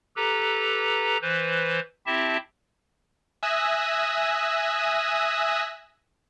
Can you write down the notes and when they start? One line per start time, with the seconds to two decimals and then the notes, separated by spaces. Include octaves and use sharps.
0.16 G4 A4 B4 A#5
1.22 E3 B4 C5
2.06 C4 E4 G4 E5 A5
3.43 E5 G#5 D#6 E6 F#6 A#6